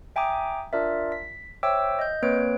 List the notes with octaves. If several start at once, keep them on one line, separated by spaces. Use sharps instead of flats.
E5 G5 G#5 A#5 D6 D#6
D4 F4 A#4 D5 E5
B6
C5 C#5 E5 G5 D6 E6
D#5 G6
A#3 C4 B4 C#5 D7